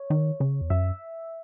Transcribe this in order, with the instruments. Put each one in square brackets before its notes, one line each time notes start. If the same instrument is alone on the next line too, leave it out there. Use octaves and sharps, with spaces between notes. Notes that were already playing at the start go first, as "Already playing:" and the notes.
Already playing: [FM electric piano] C#5
[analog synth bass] D#3
C#3
E2
[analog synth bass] F#2 [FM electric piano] E5